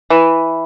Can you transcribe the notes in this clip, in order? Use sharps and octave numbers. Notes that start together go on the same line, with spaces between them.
E3